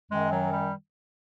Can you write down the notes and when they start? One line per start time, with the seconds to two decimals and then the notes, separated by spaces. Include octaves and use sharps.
0.11 F#2 D#3 G#3
0.32 F#3
0.53 G3